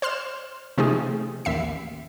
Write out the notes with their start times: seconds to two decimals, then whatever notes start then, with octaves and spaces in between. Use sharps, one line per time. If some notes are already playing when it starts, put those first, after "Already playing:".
0.02 C5 C6 F6 E7
0.78 C3 F3 A3 D#4 G4 G#4
1.45 A1 D#2 E5 C7